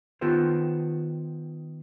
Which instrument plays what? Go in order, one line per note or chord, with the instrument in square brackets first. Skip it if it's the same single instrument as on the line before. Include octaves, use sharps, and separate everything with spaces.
[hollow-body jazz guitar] D#3 B3 F4 G4 A4 C5